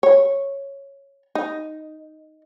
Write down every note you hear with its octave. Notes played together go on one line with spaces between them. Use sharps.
C#5
D#4